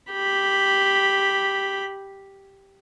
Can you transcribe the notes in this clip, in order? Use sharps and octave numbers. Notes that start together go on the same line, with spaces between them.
G4 B5